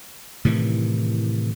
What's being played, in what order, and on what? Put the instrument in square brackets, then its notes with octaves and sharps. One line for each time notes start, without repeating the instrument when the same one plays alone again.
[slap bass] A2 C3 D#3 E3